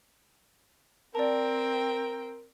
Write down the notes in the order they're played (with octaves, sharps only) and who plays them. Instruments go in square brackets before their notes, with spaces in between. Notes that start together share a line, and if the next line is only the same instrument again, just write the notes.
[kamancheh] C4 G5 [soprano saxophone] A#4 [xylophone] D5 A5